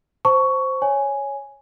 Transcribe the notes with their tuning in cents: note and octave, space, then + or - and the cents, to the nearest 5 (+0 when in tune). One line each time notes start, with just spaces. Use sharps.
C5 +0 A5 +25 C#6 +10
C#5 +0 G#5 +0